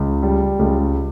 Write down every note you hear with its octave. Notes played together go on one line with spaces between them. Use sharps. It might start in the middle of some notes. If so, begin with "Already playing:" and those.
Already playing: C#2
G3
C#2